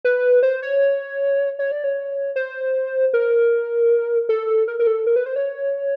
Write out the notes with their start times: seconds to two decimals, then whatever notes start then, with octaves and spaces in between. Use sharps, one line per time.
0.05 B4
0.43 C5
0.62 C#5
1.59 C#5
1.72 D5
1.84 C#5
2.36 C5
3.13 A#4
4.29 A4
4.68 A#4
4.80 A#4
4.87 A4
5.06 A#4
5.16 B4
5.26 C5
5.36 C#5